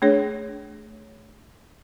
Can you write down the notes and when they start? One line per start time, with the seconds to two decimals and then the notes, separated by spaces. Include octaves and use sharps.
0.02 A3 D4 G#4 C#5